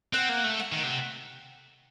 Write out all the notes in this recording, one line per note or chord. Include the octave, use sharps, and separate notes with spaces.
C4 F#5
A#3
A3
F#5
D#3
C3